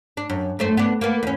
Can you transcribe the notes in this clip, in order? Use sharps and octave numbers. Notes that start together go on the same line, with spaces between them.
D4
F#2
F#2 A3 C5
B3 D4
A#3 B3
E2 C#4